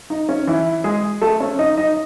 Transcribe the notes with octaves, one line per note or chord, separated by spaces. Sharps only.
D#4
C#4
E3 E4
G#3 G#4
A3 A4
C#4 C#5
D#4 D#5
D#4 D#5